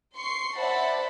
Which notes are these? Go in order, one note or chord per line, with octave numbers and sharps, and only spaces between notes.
C6 C#6 C7
C5 D5 E5 F#5 A5 B5